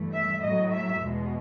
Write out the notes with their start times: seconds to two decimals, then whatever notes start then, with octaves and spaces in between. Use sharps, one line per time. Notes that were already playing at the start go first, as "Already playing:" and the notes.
Already playing: G2 E3 A3
0.12 E5
0.42 A2 F#3 A3 D#5
0.72 E5
1.01 E2 B2 G#3